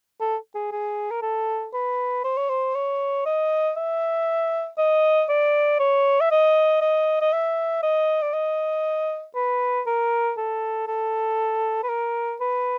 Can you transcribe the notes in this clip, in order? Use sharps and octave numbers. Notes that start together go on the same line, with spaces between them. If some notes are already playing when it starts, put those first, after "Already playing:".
A4
G#4
G#4
A#4
A4
B4
C5
C#5
C5
C#5
D#5
E5
D#5
D5
C#5
E5
D#5
D#5
D#5
E5
D#5
D5
D#5
B4
A#4
A4
A4
B4
A#4
B4